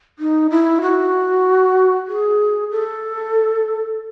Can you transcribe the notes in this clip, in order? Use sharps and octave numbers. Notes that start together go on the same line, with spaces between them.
D#4
E4
F#4
G#4
A4